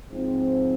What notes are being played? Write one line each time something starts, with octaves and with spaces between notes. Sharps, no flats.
G#2 F3 C4